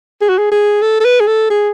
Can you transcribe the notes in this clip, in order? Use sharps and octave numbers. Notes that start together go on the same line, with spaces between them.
G#4
F#4
G#4
G#4
A4
A4
B4
G#4
A4
G#4